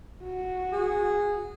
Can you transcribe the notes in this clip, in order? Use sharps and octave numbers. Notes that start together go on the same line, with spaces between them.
F#4
G#4